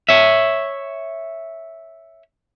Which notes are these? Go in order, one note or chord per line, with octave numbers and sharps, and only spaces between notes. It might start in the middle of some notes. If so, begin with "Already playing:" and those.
C#5 E5